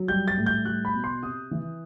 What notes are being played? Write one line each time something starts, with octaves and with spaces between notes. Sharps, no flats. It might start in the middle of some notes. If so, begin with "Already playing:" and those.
Already playing: F#3
G3 G6
A6
A2
G6
G3 F#6
B5
B2
C6
C3 D#6
E3